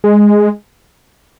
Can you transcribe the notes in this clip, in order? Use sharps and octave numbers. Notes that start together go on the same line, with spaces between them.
G#3